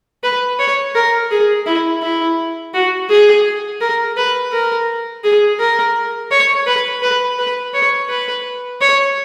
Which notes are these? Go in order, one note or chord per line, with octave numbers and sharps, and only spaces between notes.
B4
C#5
A#4
G#4
E4
E4
F#4
G#4
A#4
B4
A#4
G#4
A#4
C#5
B4
B4
B4
C#5
B4
C#5